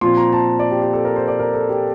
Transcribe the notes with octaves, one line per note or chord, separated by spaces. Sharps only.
A#2 F3 C4 C6
A#5
A5
D5
G4
G4
A4
A#4
C5
D5
A#4
A4
G4